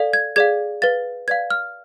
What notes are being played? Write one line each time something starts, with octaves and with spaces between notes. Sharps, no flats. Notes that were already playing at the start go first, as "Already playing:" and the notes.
Already playing: A4 D5 F5
G#6
G#4 D5 F5 G#6
B4 F5 A6
B4 D5 F5 G#6
F6